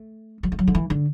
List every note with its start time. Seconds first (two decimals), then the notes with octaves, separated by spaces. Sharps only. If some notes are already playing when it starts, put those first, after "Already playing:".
Already playing: A3
0.43 F#3
0.52 A3
0.59 F#3
0.68 D3
0.75 E3
0.90 D3